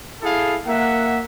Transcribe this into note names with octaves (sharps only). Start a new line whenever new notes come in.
E4 G#4 A4 F5
A#3 E5 F#5